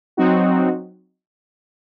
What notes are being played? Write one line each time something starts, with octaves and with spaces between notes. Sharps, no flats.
F#3 C4 D#4 F#4